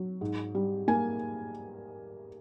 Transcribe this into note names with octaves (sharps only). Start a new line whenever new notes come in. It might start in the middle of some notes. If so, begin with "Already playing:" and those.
Already playing: F#3
G#2
G3
A#3 G#5